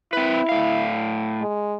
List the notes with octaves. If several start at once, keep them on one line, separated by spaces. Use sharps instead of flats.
C4 E4 B4
A2 F5
G#3